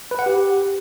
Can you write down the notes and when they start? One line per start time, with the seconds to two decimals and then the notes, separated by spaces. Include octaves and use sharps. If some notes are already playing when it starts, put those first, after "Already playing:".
0.11 B4
0.19 F#5
0.26 G4